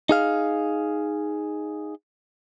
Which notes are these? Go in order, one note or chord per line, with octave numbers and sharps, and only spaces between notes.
D#4 G#4 F5